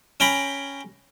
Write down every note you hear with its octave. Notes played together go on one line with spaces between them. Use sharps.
C#4 G5 A#5 B5